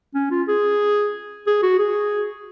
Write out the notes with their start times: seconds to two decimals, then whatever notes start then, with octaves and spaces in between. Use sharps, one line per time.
0.15 C#4
0.31 F4
0.48 G#4
1.47 G#4
1.63 F#4
1.79 G#4